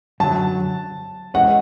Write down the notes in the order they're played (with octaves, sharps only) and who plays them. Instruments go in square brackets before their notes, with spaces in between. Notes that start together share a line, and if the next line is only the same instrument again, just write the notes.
[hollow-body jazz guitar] F#2 D3 F#3 [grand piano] A5
[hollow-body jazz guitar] E3 G#3 C#4 [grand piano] F#5